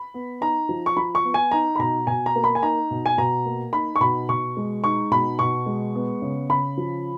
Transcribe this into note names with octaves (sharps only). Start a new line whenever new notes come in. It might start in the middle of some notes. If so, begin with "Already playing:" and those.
Already playing: B5
B3
D#4 A#5
F3
C#6
F3 B5
C#6
B3
G#5
D#4 A#5
B5
B2 A#5
B2 G#5
A#5
A#3
B5
G#5
D#4 A#5
B2
G#5
B2 A#5
A#3
D#4 B5
C#6
B2 B5
B2 C#6
G#3
D#4 C#6
B2 B5
B2 C#6
G#3
B3
C#3
C#3 B5
F3